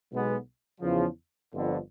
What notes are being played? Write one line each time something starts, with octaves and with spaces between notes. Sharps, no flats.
B1 B2 G#3 B3
E2 C#3 F3
G1 F2 D3